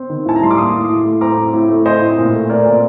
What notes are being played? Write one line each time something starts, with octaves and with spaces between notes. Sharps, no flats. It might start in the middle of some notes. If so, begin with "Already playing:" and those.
Already playing: C4
D#3
A2 A5
A#5
G3 C6
D6
A#3 C6 D#6
A2
A2
A3
C4 A#5 D6
A2
A2
A3
C4 C5 D#5
A2
A#2
A3
C4 A#4 D5
A#2